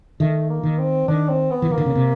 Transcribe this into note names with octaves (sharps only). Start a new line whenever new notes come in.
D#3 A3
A#3
D#3
C4
D#3 D4
C4
B3
E3
D#3 A#3
D3
C#3
C3